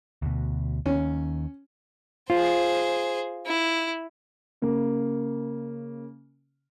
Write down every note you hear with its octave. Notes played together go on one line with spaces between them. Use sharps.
D2 B2
D#2 C#4
F4 G#4 C5
E4
C#3 A#3